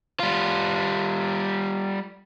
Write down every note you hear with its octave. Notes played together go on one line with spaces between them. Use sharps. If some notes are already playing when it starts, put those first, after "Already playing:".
G3 F4